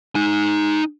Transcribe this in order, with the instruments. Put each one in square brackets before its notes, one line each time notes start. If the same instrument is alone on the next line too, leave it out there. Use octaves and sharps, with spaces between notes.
[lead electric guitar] D#4 G#5